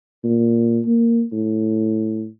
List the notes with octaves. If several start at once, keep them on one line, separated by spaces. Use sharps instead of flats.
A#2
A#3
A2